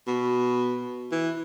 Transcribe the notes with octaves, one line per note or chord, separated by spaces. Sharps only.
B2
E3